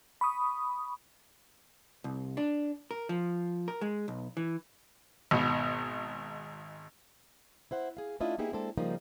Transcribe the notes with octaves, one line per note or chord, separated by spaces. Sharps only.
B5 C#6 D#6
C2
D4
A#4
F3
A#4
G#3
B1
E3
G#1 B2
E4 C5 F#5
G#4 F5
A3 C#4 D4 E4 F4 D#5
A#3 B3 D#4 E4 G4 G#4
G#3 A#3 C4 D4 E4 A4
C#3 F3 G3 A#3 D#4 A#4